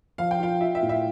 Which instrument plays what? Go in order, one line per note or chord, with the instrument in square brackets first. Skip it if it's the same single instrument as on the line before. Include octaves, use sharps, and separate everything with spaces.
[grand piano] F3 [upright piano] F5
[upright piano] G5
[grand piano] F4 [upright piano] F5
[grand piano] F4 [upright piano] E5
[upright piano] E5
[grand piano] A2
[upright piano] E5